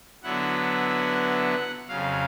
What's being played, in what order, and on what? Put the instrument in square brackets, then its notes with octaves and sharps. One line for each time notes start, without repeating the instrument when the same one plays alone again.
[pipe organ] D3 F#3 B3 E4 F#5
F2 C#3 F#3 F5